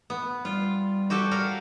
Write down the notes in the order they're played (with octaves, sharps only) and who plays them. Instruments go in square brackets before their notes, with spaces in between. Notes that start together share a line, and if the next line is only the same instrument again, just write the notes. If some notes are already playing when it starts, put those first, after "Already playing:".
[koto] B3
[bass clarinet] G3 [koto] F4
[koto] F#4 G4 A4
A#4 D5 F5